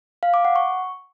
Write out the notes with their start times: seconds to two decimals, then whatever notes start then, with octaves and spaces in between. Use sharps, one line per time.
0.23 F5
0.34 D6
0.45 F#5
0.56 C#6